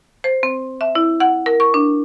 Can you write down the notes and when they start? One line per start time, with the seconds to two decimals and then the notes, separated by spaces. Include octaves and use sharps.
0.24 C5
0.43 C4
0.81 E5
0.95 E4
1.20 F#5
1.46 A#4
1.60 C#6
1.74 D4